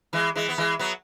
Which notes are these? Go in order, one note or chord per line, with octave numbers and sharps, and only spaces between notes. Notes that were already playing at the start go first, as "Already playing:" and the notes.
E3 G#3
E3 G#3
B3
E3 G#3
F#3 B3